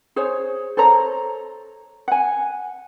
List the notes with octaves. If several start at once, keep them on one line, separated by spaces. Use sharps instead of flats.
G#4 C5 C#5
A4 C5 C#5 A#5
F#5 G#5